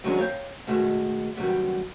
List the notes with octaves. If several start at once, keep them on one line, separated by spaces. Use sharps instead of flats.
D#3 F#3 G#3 B3 C#4 D4
C#5 F5 G5
B2 D#3 G#3 A3
F#2 D#3 G3 B3